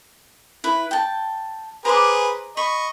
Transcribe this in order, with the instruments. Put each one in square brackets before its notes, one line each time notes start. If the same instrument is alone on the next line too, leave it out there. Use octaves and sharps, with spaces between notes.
[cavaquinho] E4 B4
G5 A5
[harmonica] G#4 B4 C5 [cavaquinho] A#5 D6
[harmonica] D#5 C#6 [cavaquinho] B5